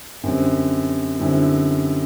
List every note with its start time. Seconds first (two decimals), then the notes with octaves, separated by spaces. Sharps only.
0.23 F#2 D3 G3 C4
1.18 F#2 D3 G3 C4 E4